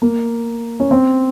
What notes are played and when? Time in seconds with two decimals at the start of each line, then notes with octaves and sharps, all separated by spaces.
0.02 A#3
0.80 C#4
0.91 C4